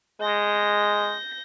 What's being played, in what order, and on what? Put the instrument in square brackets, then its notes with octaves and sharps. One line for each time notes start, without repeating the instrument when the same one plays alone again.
[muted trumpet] G#3 [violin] G6 A#6